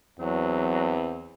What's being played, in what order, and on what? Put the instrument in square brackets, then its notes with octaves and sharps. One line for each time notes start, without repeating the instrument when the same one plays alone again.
[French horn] E2 [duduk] F#3 [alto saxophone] C4